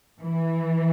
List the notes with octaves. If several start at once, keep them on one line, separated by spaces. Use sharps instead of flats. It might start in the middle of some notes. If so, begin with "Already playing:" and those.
E3